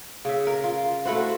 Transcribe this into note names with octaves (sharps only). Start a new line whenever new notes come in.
C#3 E5
A#4
F4
A3 E4 F#4 C5